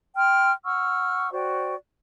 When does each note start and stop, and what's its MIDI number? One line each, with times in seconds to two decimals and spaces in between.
0.16 0.51 79
0.16 0.51 84
0.16 0.51 89
0.65 1.30 78
0.65 1.30 85
0.65 1.30 88
0.65 1.30 89
1.31 1.75 66
1.31 1.75 72
1.31 1.75 74
1.31 1.75 79